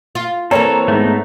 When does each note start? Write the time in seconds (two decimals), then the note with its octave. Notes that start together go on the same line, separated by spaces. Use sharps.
0.15 F4
0.51 E3 A#3 C4 A4 C#5 A#5
0.88 G#2 A3 B3 D#4